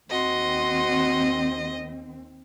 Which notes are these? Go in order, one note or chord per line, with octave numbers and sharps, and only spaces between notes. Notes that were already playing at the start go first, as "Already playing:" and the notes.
D#2 C4 F#4 D#5 C6